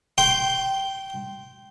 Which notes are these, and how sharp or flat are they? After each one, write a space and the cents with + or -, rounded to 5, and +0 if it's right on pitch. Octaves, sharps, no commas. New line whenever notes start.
G5 -15 C6 +0